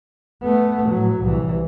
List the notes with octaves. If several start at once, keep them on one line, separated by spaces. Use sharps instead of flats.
A3 B3
A2 F#3
C2 E3